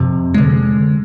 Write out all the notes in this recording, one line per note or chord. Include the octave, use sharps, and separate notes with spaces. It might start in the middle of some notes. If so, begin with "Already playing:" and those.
Already playing: F2 C3
D3 G#3